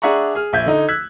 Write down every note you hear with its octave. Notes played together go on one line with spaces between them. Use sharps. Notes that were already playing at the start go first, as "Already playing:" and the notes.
D4 G#4 E5 F#5 A#5 C#6
G#4 F6
A#1 E5 G6 G#6
D3 D#4
E6 F#6 G#6 B6